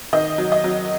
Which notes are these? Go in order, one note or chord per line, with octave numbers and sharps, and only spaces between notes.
D#3 D#5
F#3
D#5
F#3